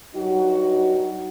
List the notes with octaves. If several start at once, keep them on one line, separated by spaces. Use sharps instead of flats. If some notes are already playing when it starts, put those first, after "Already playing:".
G2 F#3 D#4 F#4